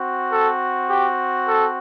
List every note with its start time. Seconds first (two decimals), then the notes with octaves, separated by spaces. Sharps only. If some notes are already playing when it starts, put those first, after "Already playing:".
Already playing: C4 F#4
0.30 A4
0.88 G4
1.47 A4